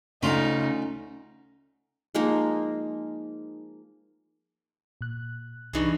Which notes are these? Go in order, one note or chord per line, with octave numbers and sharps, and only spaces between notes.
D2 C#3 C#4 D#4 F4 C6
F3 G#3 A#3 D#4
A#2 F#6
C2 G2 E3 D#4 G#4 C#6